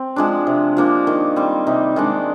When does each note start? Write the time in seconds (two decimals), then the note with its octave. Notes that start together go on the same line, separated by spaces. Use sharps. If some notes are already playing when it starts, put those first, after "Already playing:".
Already playing: C4
0.16 F3 G#3 D4
0.47 C3
0.77 F3 A#3 D4
1.07 D#3
1.36 G3 C4
1.67 C3 D#4
1.96 D#3 G#3 D4